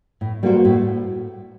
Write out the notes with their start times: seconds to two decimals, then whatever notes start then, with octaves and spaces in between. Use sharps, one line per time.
0.21 A2
0.43 G3 A#3 F#4 C5
0.65 A2